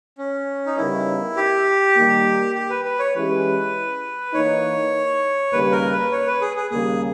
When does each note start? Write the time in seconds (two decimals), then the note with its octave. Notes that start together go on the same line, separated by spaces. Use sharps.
0.18 C#4
0.66 D#4
0.77 C#3 G3 B3 D#4 E4 A#4
1.37 G4
1.96 D#3 G3 A#3
2.55 G4
2.70 B4
2.85 B4
2.99 C#5
3.14 E3 G#3 C#4 E4 G4 B4
4.33 E3 A#3 D#4 C#5
5.52 D#2 C#3 G3 A#3 B4
5.72 A#4
5.92 B4
6.12 C#5
6.27 B4
6.41 G#4
6.56 G#4
6.71 D#2 C#3 G3 A#3 G#4